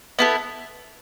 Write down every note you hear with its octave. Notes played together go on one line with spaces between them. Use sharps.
B3 E4 A4